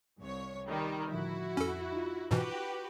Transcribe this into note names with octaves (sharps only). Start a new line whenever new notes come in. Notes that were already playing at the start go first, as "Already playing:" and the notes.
C2 C#5
D#3 G3
A2 D3 F3 E4 F#4
F2 C#4 A4
D#4 F4
G#2 B2 E3 F#4 G4 B4